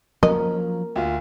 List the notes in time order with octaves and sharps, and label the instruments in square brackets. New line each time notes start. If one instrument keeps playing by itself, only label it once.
[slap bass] F3 F#3 C#4 [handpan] A#4 [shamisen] D#5
[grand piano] D2 F4